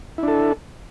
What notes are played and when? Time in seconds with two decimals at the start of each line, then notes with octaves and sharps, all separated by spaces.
0.18 E4
0.23 D4
0.28 A4